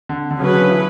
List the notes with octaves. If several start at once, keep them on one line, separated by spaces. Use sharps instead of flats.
D3
D3
C#3 F#3 C#4 G#4 B4
D3
E3